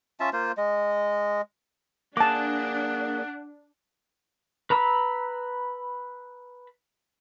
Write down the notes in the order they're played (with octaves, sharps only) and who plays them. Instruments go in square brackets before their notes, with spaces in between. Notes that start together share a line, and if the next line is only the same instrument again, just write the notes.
[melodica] C#4 F4 E5 A5
A#3 F4 C5
G#3 D#5
[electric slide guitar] A#3 G#4 [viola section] D4 [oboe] F#5 [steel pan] A5 D6
[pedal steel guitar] B4 A#5 B5 E6